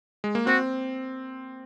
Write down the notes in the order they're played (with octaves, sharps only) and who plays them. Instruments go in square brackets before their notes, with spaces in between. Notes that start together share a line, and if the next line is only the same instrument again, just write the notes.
[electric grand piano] G#3
A#3
[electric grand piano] C4 [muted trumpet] F#4